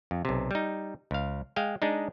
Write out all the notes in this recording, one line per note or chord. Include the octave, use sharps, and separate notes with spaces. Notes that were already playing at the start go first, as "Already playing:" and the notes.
F2
B1 C3
G3 D#4
C#2 F5
G#3 F5 G5
G#3 D4 D#4